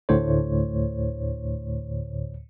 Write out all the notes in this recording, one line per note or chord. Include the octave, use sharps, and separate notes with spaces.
D2 A2 D3 C5 C#5